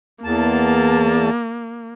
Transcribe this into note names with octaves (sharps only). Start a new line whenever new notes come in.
E2 A#3 A5